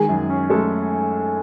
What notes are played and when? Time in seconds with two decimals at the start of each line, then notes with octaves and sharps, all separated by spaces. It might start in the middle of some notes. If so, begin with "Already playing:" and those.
Already playing: D#3 G#3 G#4
0.09 F#2
0.30 C#4
0.50 G#3 A3 A4